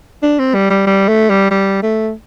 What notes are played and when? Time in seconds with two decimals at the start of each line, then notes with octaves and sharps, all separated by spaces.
0.23 D4
0.39 C4
0.54 G3
0.70 G3
0.86 G3
1.08 A3
1.30 G3
1.51 G3
1.83 A3